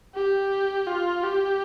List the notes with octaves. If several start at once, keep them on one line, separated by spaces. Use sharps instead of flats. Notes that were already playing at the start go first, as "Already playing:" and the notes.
G4
F4
G4